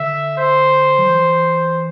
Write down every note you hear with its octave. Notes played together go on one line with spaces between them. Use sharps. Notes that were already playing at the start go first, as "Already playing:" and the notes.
Already playing: D3 E5
C5
F#3
E3